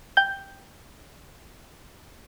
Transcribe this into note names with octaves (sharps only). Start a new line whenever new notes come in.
G5 G6